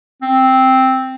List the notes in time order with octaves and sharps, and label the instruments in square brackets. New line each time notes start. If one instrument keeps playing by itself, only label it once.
[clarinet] C4